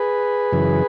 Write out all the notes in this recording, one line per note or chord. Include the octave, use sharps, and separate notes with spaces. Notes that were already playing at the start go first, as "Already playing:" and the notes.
Already playing: G#4 B4
F#2 C#3 E3